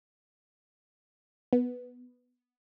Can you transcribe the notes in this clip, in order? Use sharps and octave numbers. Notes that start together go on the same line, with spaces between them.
B3